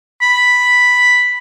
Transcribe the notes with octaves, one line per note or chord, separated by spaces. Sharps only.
B5